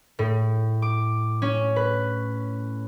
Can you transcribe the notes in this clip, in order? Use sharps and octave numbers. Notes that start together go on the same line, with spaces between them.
A2
D6
C#4
B4